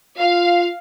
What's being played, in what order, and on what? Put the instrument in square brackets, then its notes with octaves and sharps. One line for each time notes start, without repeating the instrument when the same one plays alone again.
[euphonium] F4 [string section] F5